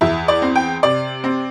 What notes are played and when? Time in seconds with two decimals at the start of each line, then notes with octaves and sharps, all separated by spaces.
0.01 E2 E5
0.28 D5
0.42 C4
0.55 G5
0.83 C3 D5
1.24 C4